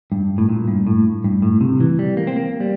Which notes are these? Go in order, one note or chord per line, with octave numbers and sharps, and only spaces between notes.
G2
A2
A#2
G2
A2
G2
A2
C3
E3
G3
A#3
C4
A#3
G3